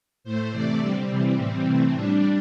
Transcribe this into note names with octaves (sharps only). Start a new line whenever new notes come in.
A2 A3 C5
C3 E3 A3 D5
D3 G3 C4
C3 E3 G3
A2 E3 G3 C4
C3 E3 A3
A2 G3 D4